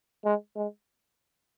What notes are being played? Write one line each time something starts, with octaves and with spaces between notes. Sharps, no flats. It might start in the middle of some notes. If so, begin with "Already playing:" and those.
G#3
G#3